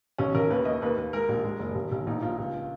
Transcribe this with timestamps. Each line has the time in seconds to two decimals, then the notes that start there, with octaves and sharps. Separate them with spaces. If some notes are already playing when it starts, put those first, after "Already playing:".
0.18 B1 C#4
0.35 B1 A#4
0.50 D#2 B4
0.65 D#2 D#5
0.82 D#2 B4
0.97 D#2
1.13 G#3 A#4
1.29 A#1
1.44 G#3
1.59 F#1
1.75 B1
1.92 B1
2.07 A#1 D#4
2.22 A#1 F4
2.38 C#2